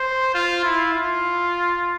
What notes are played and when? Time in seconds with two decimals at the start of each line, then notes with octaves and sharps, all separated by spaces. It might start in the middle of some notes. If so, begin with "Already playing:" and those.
Already playing: C5
0.34 F4
0.64 E4
0.93 F4